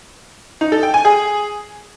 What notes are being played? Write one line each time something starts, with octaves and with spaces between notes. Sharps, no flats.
D#4
A4
G5
G#5
G#4